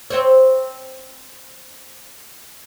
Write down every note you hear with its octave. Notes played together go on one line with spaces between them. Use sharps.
C4 C5 C#5